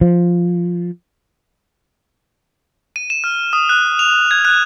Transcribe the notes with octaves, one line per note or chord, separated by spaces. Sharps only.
F3
D#7
E7
F6
D#6
F#6
F7
G#6
F#6